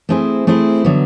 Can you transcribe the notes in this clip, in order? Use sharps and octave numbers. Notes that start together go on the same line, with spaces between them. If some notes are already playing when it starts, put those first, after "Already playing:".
A3 C4 E4 G#4 C5
A3 C4 E4 G#4 C5
D3 F#3 B3